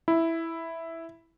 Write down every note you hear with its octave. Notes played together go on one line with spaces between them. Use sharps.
E4